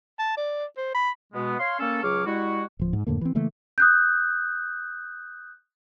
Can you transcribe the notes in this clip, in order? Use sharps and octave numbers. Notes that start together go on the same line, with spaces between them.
A5
D5
C5
B5
B2 G#3 B3
C#5 F5 C6
A#3 C#4 A4
C#2 F#3 G#4 C#5 D6 F6
G3 G#3 E4 F#4
D1 F3
G#2
F2 A2 D3 A#3
E3 C4
C#3 E3 A3 A#3
D#6 F#6 G6